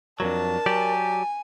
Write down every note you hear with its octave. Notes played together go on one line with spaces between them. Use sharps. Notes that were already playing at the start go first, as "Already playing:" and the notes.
F2 G#2 F#3 D4 A#4 A5
F#3 G4 D5 G#5